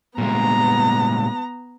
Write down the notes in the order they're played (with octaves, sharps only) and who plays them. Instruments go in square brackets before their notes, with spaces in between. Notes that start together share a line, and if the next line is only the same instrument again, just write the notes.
[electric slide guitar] A#2 G3 G#3 [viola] B3 A#5